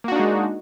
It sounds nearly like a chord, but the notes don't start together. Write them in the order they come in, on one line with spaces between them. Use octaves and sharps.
A#3 F#4 D4 D#4 G#3